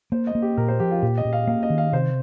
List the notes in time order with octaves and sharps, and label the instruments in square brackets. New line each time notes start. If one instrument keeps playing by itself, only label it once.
[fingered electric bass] A#3 [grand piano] C5
[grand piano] D#5
[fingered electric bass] A#3
[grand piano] G4
[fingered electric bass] A#2 [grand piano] A#4
[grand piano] C5
[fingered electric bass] F3 [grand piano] G4
[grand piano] F4
[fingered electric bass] A#2 [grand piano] G4
[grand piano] D#5
[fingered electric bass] A#2
[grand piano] F5
[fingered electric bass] A#3 [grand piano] F5
[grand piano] D#5
[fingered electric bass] D#3
[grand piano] F5
[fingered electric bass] C3 [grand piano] C5